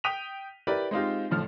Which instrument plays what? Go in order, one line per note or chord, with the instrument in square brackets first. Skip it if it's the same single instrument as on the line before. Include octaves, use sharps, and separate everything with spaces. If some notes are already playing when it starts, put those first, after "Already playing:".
[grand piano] G5 D#6 B6 D#7 F7
E4 G4 A#4 B4 D5
G#3 C4 D#4 F4 G4
F#1 A2 F3 F6